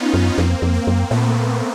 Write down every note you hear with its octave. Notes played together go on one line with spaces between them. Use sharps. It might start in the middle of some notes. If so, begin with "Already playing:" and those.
Already playing: B3 C#4 D#4 F4
F#2
F2 A#3 C4
F2
A#3
F#2
A#2 A3 B3